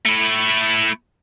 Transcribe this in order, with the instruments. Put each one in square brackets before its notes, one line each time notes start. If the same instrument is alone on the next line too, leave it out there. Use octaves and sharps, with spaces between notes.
[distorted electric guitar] A3 E4